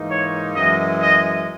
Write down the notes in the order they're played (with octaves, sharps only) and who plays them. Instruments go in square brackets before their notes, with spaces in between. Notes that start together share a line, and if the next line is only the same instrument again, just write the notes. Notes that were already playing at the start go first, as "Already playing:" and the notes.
Already playing: [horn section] G#2 E3 A#3 D#4
[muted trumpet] C#5
[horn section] F#2 E3 G#3 [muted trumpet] D#5
[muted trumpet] D#5